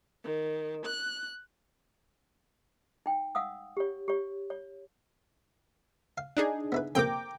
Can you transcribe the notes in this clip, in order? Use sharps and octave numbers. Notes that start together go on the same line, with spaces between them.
D#3
F#6
D#4 G5
F5 F#5 D#6 E6
G4 C#5
G4 C#5
C#5
F5
D4 D#4 G#4
B3 E4 B4
F2 C3 A#3 G5 A#5 D6